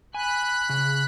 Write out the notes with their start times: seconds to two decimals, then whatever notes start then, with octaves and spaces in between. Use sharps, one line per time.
0.14 G#5 B5 F#6
0.69 C#3